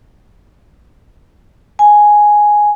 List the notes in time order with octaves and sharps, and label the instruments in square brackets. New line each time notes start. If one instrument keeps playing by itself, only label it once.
[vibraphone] G#5